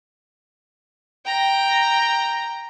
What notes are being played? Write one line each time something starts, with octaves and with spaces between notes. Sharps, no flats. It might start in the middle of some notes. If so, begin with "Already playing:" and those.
G5 A#5